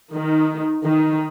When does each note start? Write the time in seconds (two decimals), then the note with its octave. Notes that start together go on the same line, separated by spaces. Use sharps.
0.12 D#3
0.84 D#3